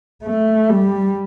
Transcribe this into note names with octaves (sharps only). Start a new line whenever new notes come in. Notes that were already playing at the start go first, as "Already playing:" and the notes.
A3
G3